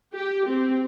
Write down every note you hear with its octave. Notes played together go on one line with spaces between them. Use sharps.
G4
C4